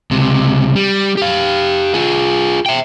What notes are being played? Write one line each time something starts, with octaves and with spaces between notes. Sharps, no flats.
C#2 C3
G3
G4 F5
F4 G#4
E5 G5